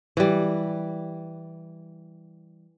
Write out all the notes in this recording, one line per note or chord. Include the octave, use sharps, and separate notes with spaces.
E3 G3